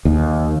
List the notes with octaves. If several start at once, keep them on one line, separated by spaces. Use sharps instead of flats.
D#2